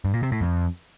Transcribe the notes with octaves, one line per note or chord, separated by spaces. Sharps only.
G2
A#2
C3
A2
F2